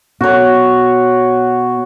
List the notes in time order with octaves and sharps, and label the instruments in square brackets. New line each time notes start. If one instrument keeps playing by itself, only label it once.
[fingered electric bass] B2 [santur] F#4 C#5